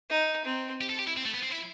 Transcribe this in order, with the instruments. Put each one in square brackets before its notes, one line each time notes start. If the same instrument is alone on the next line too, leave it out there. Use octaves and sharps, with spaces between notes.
[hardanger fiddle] D#4
C4
[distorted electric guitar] G4
A4
G4
E4
C4
A3
B3
C4
E4